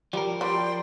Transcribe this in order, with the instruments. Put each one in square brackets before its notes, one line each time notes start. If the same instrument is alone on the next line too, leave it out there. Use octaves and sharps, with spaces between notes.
[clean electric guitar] F3 A#4 [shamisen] G3
[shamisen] G3 [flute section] D5 G5 C6